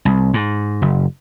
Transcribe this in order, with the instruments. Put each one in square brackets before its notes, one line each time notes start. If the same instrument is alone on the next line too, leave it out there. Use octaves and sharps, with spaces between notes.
[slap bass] C2
G#2
F#1